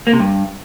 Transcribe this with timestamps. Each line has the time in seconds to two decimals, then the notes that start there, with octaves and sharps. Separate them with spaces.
0.07 A#3
0.13 C3
0.20 G2